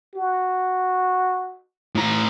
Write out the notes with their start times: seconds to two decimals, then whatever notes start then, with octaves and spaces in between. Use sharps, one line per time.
0.15 F#4
1.95 A2 A#5